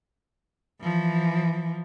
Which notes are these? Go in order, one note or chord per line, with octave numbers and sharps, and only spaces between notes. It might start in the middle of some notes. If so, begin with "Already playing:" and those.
E3 F3